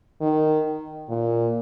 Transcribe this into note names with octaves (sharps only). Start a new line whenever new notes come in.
D#3
A#2